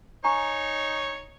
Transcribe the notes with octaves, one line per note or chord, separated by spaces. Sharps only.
D#4 C#5 G#5 A#5 C#6